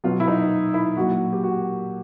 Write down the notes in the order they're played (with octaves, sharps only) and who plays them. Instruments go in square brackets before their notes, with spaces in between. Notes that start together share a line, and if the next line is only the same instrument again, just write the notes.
[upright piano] B2 F#3 F4
E4
D#4
E4
A#2 F#3 F#4
G4
F#4